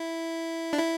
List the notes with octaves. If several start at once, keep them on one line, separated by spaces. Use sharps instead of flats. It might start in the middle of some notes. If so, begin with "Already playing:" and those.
Already playing: E4
D4
E4